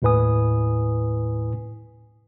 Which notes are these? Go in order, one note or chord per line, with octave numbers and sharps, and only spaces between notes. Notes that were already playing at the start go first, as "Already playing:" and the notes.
D#2 A2 E4 B4 G#5 D#6